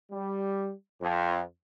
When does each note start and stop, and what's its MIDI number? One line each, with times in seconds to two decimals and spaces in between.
0.11 0.72 55
0.99 1.41 41